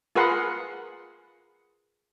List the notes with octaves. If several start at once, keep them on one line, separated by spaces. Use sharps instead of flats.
F4 G#4 A#4 B4 F#5 C6